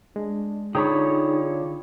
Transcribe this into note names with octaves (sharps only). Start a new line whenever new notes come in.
G#3 D4
D3 D#4 F4 G#4 C#5 G5 B5 C#6